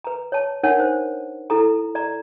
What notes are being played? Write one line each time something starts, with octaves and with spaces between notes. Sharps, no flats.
B4 A#5
C#5 A5
D4 D#4 A#4 C#5 F#5 A5
C5
E4 A4 A#5
D5 A#5